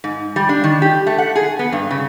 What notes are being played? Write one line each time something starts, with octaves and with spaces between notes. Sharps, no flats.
G#2
G3
D4
D#3
G4
A3
F#5
G#4
B3
G2
C#3